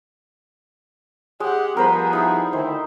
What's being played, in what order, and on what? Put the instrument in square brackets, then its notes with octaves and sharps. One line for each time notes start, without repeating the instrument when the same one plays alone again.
[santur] G#3 [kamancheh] G4 F#5
[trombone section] F3 G3 B3 [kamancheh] G#4 [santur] A#4 C5 B5
[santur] D#4 E4
[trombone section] D2 D#3 E4 [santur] C5